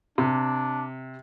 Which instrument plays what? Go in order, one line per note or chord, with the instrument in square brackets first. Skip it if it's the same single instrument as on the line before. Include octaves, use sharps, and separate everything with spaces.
[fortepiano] C3 [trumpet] D4